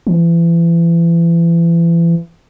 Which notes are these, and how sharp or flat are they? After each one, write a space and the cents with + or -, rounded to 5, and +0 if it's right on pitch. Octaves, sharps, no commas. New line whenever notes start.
E3 +35